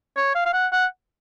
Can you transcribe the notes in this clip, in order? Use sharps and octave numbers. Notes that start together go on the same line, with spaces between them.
C#5
F5
F5
F#5
F#5